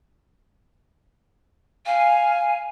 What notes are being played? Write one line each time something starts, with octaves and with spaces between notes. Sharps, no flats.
F5 G#5